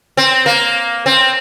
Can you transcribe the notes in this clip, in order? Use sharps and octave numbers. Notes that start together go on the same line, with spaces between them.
C4
A#3
C4